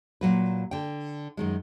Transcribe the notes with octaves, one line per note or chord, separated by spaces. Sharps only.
A#2 F#3 B4
D3 G5
F#2 D#3 G#3